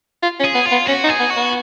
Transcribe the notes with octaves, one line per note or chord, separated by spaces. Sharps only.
F4
C#4
G#4
B3
F4
B3
C#4 F#4
D#4
G#4
B3
F#4
B3